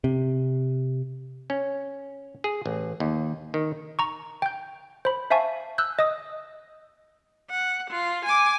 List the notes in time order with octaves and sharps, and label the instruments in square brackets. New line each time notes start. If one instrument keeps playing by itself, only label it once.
[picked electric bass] C3
[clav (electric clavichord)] C#4
G#4
A1
D#2
D#3
[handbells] A#5 C#6
G5 G6
C5 B5
C5 E5 F5 G#5 A5 C#6
E6 F#6 G6
D#5 D#6
[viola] F#5
F4
G#5 D6